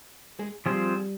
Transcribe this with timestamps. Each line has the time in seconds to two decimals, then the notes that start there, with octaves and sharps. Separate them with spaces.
0.39 G#3
0.66 F3 G3 C4 F4 G#4 C5